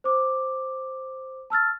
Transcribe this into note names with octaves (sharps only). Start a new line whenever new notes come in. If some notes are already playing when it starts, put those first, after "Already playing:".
C5 D6
A5 E6 F6 A6